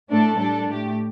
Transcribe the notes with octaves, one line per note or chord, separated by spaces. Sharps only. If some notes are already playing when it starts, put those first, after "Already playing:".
A2 A3 D4 A4
G3 D4 A4
A2 A3 G4